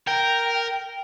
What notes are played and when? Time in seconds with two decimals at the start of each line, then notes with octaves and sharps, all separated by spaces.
0.07 A#4 G5